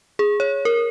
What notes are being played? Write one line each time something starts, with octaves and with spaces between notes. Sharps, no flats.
G#4
C#5
A#4